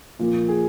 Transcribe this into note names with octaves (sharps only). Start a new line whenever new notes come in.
A#2 F3 A#3
G#4